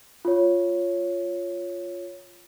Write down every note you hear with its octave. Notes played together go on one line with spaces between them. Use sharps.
F4 C#5